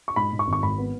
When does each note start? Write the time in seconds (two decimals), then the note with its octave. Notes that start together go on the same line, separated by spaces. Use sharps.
0.08 C#6
0.16 G#2 B5
0.33 G#2
0.39 C#6
0.47 G#1
0.53 C#6
0.63 G#1 B5
0.78 B3